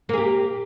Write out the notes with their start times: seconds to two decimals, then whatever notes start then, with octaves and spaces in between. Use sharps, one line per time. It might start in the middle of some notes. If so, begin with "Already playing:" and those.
0.09 A#3
0.13 G#4
0.18 G4